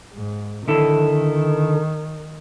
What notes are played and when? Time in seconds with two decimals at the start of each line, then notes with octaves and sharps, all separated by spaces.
0.14 G#2
0.68 D3 D#3 E4 A4